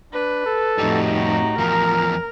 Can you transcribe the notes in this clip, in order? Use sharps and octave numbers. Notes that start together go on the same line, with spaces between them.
D4 B4
A4
F2 A2 G3 D#4 F#4 G4
A#5
E2 F3 A#4